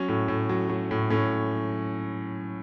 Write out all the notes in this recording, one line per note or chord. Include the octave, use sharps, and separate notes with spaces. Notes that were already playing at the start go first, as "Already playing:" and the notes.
Already playing: F#3 C#4
A2
A2
F#3
F#3
A2
A2 C#4